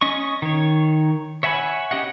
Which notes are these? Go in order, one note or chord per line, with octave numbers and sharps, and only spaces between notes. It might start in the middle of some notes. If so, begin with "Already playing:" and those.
C#4 D#5 C#6
D#3 C#5
C#5 E5 F#5 G#5 B5
C#4 G4 D#5 F#5